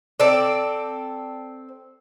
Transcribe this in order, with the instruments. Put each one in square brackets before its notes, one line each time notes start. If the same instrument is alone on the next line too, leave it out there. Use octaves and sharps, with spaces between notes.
[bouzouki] C4 A4 D5